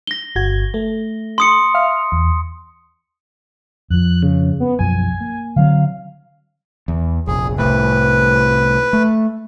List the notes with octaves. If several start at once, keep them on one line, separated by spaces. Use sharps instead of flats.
A#6 G7
G1 F#4 G#6
A3
C6 D#6 C#7
E5 F5 F6
E2
F2 F3 F#6
C#3
B3
B1 F#2 F3 G#5
A#3
D3 F#3 C4 F5
E2
F1 A#1 G#4
C2 A2 B4
A3